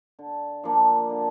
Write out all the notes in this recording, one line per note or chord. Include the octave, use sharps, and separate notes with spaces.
D3
F3 A#3 D4
D3